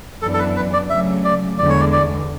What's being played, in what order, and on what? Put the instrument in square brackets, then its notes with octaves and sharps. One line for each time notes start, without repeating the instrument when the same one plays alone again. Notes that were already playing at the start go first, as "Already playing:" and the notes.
[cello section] F#2 E3 B3 D4 [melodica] A4
[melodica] A4
B4
B4
D5
[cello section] C#3 F#3 A3 [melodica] E5
[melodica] D5
[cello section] E2 D3 G#3 [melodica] D5
[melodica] C#5
D5
D5